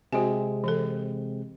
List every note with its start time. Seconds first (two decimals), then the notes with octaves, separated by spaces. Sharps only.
0.13 C3 G#3 C4 F#4 G4 G#5
0.64 E3 A4